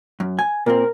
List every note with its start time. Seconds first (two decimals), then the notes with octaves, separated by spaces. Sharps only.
0.20 F#2
0.39 G#5
0.66 A#2 A#3 C4 A#4